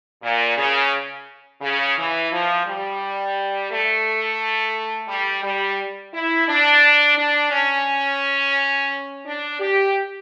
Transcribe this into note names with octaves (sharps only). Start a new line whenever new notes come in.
A#2
C#3
C#3
E3
F3
G3
A3
G3
G3
E4
D4
D4
C#4
D4
G4